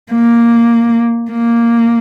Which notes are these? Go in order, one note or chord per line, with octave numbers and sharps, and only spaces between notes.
A#3
A#3